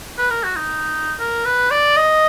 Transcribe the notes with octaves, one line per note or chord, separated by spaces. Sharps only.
B4
A#4
F#4
D#4
A#4
B4
D5
D#5